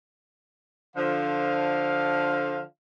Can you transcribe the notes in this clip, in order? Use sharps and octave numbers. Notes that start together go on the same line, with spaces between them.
D3 F3 F5